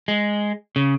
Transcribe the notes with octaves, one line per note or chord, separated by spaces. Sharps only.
G#3
C#3